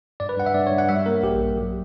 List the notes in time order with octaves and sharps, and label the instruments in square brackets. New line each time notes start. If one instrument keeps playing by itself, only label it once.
[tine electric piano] G2 D5
B4
G2 F#5
E5
G2 D5
C#5
G2
F#5
G3 E5
A#3 A#4
A#1 G4
A#1
F#3